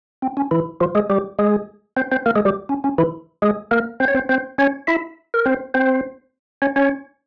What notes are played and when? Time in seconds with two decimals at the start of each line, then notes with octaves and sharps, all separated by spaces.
0.22 C4
0.37 C#4
0.51 E3 E4
0.81 F3 F4
0.95 G#3 G#4
1.10 G3 G4
1.39 G#3 G#4
1.97 C4 C5
2.12 C4 C5
2.26 A#3 A#4
2.36 G#3 G#4
2.45 G3 G4
2.69 C#4
2.84 C#4
2.98 E3 E4
3.42 G#3 G#4
3.71 A#3 A#4
4.00 C4 C5
4.08 C#5
4.14 C4 C5
4.29 C4 C5
4.58 C#4 C#5
4.87 E4 E5
5.34 A#4
5.46 C4 C5
5.74 C4 C5
6.62 C#4 C#5
6.76 C#4 C#5